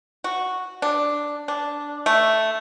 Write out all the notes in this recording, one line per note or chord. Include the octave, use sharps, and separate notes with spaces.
F#4
D4
D4
A3